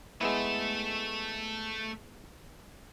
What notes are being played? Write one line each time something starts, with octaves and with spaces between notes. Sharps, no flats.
G#3 A3 B3 E4 E5